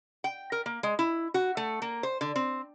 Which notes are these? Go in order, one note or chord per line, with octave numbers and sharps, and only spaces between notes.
G5
A#4
A#3
G#3
E4
F#4
A3
A#3
C5
D3
C4